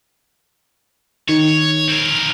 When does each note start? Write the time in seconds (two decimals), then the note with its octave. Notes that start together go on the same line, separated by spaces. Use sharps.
1.29 D#3 C#5
1.88 C4 A#4